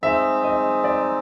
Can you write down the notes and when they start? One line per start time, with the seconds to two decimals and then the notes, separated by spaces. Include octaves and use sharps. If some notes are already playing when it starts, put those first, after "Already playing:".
0.03 G#3 C4 D#4 E5
0.43 D#5
0.84 D5